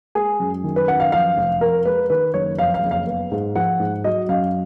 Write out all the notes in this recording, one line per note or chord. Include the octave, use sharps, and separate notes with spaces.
G#3 G#4
F#2
D#3
B4
F#2 F#5
F5
F3 F5
F1
F2 A#4
G#3 B4
D#3 B4
F#1 C#5
F2 F5
F5
F#1
F5
B3
G#2
F3 F#5
G#2
F#3 D#5
F#2 F5